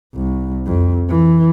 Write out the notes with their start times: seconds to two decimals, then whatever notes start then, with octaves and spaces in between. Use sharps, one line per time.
0.15 C2
0.67 F2
1.09 E3